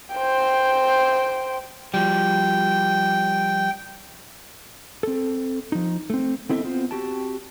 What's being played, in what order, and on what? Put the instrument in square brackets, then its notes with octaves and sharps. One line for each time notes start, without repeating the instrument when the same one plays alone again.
[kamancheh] C5 G5
[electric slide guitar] F3 G3 [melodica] G5
[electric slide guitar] C4 A4
F3 D#4
A3 C4
B3 C4 E4 A4 D#5 E5
B3 C4 F4 C5
C4 F#4 G4 G5 A5